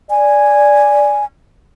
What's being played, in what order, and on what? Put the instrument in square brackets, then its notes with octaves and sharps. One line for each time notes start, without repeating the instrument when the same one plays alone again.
[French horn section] D5 [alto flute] G#5